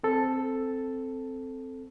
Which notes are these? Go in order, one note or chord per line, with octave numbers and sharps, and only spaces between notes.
C4 A4